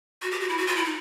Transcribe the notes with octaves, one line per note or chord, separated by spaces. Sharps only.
F#4
G4
F#4
E4
F#4
F4
E4
D#4